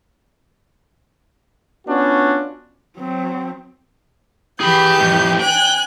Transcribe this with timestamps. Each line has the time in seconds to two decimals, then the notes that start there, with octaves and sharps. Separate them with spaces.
1.87 B3 C#4 D4 F4 F#4
2.98 F#3 C4
4.61 E3 G4 G#4 B5 G6
5.00 F2 A2
5.40 G5 G#5 F#6